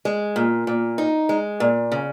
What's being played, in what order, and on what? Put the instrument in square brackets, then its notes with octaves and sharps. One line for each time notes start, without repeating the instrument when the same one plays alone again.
[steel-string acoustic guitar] G#3
A#2
A#2
D#4
G#3
A#2
C#3